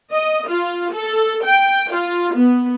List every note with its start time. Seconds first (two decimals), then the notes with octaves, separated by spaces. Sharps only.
0.12 D#5
0.49 F4
0.93 A4
1.45 G5
1.94 F4
2.35 B3